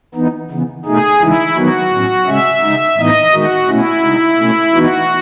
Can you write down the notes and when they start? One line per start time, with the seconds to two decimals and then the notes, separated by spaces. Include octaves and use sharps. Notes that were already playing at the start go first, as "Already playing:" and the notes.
0.15 E3 B3 D#4
0.51 C#3 E3 B3
0.85 B2 A3 D#4 G#4
1.20 C#3 E3 G#3 D#4 E4
1.55 D#3 F#3 B3 D#4 F#4
1.92 A2 F#3 C#4
2.26 C#3 G#3 C#4 E5
2.62 C#3 G#3 D#4
2.97 A2 E3 B3 D#4 D#5
3.32 D#3 G#3 D#4 F#4
3.68 B2 A3 C#4 E4
4.02 C#3 G#3 D#4
4.38 B2 A3 C#4
4.73 E3 B3 D#4 F#4